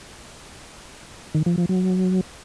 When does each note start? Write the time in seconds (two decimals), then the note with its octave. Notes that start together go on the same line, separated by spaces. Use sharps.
1.35 D#3
1.46 F3
1.57 F3
1.69 F#3